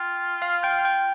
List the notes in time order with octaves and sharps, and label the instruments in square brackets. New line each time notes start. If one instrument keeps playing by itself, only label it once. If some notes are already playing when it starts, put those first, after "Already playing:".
Already playing: [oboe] F4 [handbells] G5
[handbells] F5 F6
F6
G5 G6
G5 G6